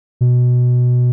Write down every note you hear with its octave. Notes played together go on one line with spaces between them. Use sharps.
B2